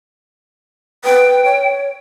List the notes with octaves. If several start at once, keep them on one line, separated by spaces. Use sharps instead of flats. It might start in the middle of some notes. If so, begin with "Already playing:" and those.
B4 G5
C#5